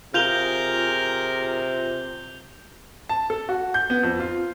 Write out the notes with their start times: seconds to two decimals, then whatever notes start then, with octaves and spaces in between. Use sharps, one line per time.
0.14 C3 F4 G#4 A#4 G6 F7 G7
3.09 A5
3.30 A4
3.49 F#4
3.74 G6
3.90 B3
4.03 F2
4.20 F4